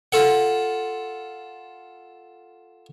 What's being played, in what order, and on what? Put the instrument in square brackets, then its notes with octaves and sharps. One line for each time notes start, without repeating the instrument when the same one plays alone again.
[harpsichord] F4 A4 F#5